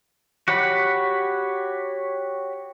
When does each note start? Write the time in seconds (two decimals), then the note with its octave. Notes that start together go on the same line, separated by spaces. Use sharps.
0.48 F#4 G4 C#5 F#5 B5